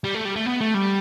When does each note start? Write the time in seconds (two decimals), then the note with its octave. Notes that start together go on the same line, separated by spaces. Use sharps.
0.04 G3
0.15 A3
0.25 G3
0.36 A3
0.46 B3
0.61 A3
0.74 G3